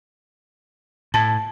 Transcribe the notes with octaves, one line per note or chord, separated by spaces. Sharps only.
A2 A5